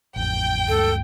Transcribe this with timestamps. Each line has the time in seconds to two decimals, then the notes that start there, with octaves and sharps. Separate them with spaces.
0.16 A1 F2 G5
0.69 D2 G2 G#3 A4